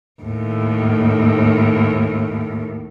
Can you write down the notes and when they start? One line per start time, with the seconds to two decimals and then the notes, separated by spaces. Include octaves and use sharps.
0.23 D#2 A2